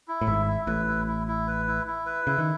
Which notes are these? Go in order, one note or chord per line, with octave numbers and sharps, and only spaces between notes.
E4
A2
G#1 G#2 E5
E4
A1 A2 B4
E4
E4
E4
B4
E4
E4
B4
C#3 E4
D#3